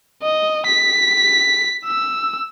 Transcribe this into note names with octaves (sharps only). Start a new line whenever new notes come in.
D#5
B6
E6